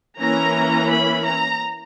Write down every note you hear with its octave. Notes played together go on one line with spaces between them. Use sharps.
E3 A#3 C#4 A#5
B5
A#5